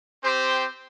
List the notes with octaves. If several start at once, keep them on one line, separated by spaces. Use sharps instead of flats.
C4 G4 C5